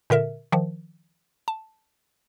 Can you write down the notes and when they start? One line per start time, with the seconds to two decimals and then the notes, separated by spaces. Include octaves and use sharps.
0.10 A#2 D3 A#4 E5
0.52 D#3 F3
1.48 A5